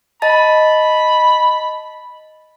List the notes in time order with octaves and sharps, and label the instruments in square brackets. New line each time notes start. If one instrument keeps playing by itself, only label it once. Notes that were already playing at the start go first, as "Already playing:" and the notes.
[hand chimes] D#5 A5 A6 [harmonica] B5